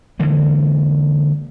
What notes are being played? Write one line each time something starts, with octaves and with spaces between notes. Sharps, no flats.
D3 E3 G#3 A#3